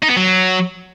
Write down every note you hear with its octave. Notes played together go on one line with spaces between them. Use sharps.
D#4
B3
F#3